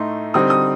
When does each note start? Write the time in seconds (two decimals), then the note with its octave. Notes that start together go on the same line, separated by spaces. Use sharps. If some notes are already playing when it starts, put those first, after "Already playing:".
Already playing: A2 A3 D#4 C6
0.34 D3 G3 C4 D#4 D#6
0.50 D#6